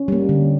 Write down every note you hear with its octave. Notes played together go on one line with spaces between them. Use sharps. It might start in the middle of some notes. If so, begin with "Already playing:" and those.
Already playing: C#4
G3 A#3
D3